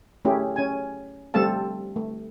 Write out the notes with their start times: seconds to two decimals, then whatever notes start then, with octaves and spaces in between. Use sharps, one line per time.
0.25 A3 C#4 E4 G4 G#4
0.56 C#4 G#5
1.34 G3 A3 C4 A4 F5 A5
1.96 A3